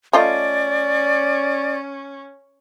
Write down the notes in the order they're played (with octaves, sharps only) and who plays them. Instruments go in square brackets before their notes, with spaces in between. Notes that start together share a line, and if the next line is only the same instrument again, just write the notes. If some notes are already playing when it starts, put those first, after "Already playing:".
[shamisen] A3 F4 D#5 [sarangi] C#4 [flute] D5